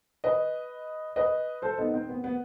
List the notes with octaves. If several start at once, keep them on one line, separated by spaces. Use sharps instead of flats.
B4 D#5
B4 D#5
A4 C5
B3 D#4
C4
B3
B3